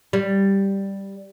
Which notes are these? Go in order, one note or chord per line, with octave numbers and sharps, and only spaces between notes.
G3